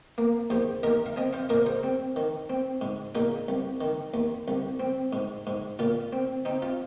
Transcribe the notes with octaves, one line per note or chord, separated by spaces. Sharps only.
A#3
D#2 G#4 C5
D#2 A#4 D#5
F5
C4 D#5 G#5
C5 F5
A#2 A#4 D#5
G#4 C5
C4
D#3
C4
G#2
A#2 D#4 G#4
C2
D#3
D#2
C2
C4
G#2
G#2
A#2 F4
C4
C4 D#4
F4